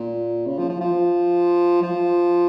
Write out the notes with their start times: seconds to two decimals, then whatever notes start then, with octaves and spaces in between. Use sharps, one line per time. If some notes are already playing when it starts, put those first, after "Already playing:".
Already playing: A#2
0.47 C#3
0.58 F3
0.69 F3
0.81 F3
1.82 F3